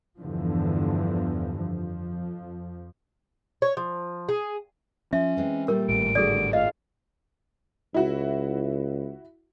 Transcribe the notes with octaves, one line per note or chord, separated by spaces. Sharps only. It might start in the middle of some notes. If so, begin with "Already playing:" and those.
E2 G2 D3 E3 F3
F2 F3
C#5
F3
G#4
F3 C#4 E5
E3 G#3 C4
A#2 G3 A3 A#4
G#1 A2 D7
D3 G3 F#4 G#4 A4 D5
F4 D#5 F5
C#2 E4 F#4